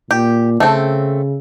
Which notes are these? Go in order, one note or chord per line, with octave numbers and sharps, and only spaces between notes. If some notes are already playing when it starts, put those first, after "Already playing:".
A#2 G4
C#3 A3 C4